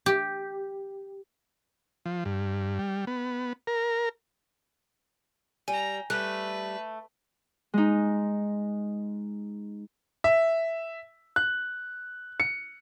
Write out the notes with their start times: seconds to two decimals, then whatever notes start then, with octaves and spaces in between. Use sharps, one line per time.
0.06 G4
2.06 F3
2.25 G2
2.79 G3
3.07 B3
3.67 A#4
5.68 G3 G5 G#5 A#5
6.10 G3 A3 B4 F#6
7.74 G#3 D#4
10.24 E5
11.36 F#6
12.40 C#7